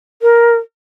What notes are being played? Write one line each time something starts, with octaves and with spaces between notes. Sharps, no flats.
A#4